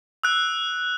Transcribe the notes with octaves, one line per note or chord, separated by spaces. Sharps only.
E6 F#6